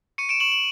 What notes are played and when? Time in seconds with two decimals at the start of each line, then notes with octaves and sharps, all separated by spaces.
0.18 C#6 C#7 D#7
0.29 D7 E7
0.40 C#6 E7 F#7
0.52 E7 F#7